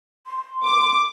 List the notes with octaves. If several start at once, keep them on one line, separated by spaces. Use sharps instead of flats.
C6
D6